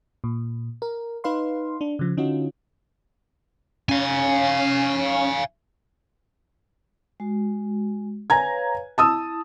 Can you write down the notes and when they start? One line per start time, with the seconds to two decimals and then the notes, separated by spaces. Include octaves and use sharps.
0.24 A#2
0.82 A#4
1.24 D#4 B4 F5 C6
1.81 D4
1.99 C#3 F3
2.17 D3 C#4 D#4 F4 F#4
3.89 C#4 F5 G#5
7.20 G#3 F#4
8.30 B4 C#5 F5 G#5 A#5 G#6
8.98 E4 A5 D#6 E6